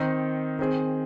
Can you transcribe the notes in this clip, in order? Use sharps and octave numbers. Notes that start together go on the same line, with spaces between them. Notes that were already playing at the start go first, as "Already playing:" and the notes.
Already playing: D#3 C4 D#4
D#3 C4 G#4